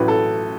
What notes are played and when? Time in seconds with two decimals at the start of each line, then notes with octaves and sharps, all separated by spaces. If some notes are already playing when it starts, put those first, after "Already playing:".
Already playing: A1 A2 F#3 B4
0.08 A4